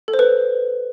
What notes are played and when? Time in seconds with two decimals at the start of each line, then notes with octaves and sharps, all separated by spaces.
0.08 A4
0.14 C5
0.19 B4